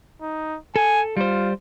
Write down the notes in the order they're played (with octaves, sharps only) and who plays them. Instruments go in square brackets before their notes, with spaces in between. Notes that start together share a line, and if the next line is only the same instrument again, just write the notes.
[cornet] D#4
[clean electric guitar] A4 [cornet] G#5
[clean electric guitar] G3 C5 [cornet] F4